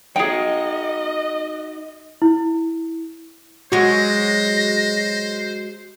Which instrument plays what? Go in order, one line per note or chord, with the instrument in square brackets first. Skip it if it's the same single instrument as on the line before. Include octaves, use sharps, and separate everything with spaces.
[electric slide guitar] D#4 F#4 [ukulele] G#4 G5 [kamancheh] D#5
[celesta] E4
[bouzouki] F#3 G#3 [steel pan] F#4 [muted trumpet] C5 [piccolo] A#6